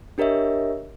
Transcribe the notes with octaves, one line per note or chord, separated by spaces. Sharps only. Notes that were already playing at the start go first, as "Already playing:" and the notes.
D4 G4 A#4 C#5 D#5 E5